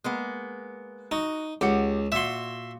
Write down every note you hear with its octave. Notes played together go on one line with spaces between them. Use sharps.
G#3 A#3 B3
D#4 F#4
C#2 G4 F#5
A#2 F#4 E5 C6